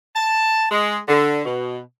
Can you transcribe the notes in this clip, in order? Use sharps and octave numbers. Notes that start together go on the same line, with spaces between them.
A5
G#3
D3
B2